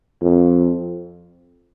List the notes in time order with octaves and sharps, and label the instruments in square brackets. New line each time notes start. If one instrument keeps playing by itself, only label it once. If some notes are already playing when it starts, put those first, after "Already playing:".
[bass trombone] F2